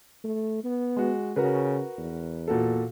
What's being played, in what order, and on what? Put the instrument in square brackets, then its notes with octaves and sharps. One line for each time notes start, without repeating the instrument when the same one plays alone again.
[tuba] A3
B3
[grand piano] G#3 F#4
[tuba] C#3 [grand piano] F#4 A#4 B4
[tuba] E2
[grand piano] A#2 F#4 A4